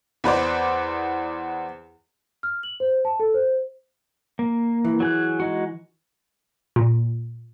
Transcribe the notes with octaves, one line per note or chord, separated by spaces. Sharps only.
E2 B4 C5 D5
F6
F#7
C5
A5
A4
C5
A#3
E3
F#3 G#4 F#6
G#3 D#4 F#4
A#2